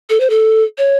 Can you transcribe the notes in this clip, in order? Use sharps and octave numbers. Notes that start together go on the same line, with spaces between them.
A4
C5
A4
C#5